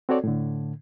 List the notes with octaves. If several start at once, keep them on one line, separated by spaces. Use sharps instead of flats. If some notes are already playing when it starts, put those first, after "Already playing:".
C4 F#4 A4 C#5 D5
A2 D3